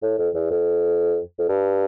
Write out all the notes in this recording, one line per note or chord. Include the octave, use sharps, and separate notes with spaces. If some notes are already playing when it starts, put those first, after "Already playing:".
A2
F2
E2
F2
F2
G2